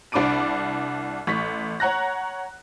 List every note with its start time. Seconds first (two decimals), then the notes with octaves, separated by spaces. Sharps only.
0.12 C2 D4 B5 D6 D7 D#7
1.27 A1 C#6 B6
1.80 C#5 F#5 A#5 F#6 A#6